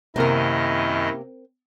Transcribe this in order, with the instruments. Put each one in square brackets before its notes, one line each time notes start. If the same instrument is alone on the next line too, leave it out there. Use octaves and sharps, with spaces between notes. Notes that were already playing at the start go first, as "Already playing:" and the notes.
[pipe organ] F#2 D#3 D#5 [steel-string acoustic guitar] C3 A#3 [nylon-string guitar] C4 A#4 [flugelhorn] E4